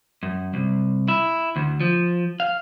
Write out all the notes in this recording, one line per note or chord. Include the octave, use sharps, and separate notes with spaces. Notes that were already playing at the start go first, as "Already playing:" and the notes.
F#2
C2
E4
D2
F3
F5